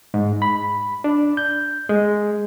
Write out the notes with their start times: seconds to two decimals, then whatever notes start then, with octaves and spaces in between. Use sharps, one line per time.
0.14 G#2
0.42 B5
1.04 D4
1.37 G6
1.89 G#3